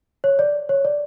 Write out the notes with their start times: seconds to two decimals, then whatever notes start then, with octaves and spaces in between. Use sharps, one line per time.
0.24 C#5
0.39 D5
0.69 C#5
0.85 D5